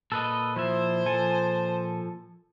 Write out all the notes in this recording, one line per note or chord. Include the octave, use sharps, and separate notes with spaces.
A#2 A4 B4 D#5
F3 E4 C5 E5
F3 A4 G#5